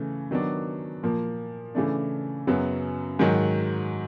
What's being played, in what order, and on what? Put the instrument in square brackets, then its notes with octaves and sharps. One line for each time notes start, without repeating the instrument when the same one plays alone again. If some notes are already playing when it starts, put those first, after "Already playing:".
Already playing: [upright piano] C#3 E3 A3
D#3 F#3 B3 D4
A#2 F3 A#3
C#3 E3 A3 D4
F#2 C#3 F#3 B3
G#2 D#3 F#3